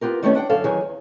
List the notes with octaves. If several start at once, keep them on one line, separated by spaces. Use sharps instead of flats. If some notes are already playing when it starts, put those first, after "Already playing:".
B3 F4 G4 A#4
D3 D#3 G3 A3 B3 C#4
D4 F#5 G5
F#2 D3 A4 F5
D#3 E3 F#3 G#4
E2